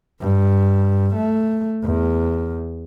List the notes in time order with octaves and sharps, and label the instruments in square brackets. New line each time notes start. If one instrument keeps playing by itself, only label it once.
[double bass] G2
A3
E2